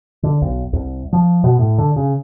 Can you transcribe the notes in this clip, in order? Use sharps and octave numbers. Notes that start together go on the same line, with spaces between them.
D3
B1
C2
F3
B2
A2
D3
C#3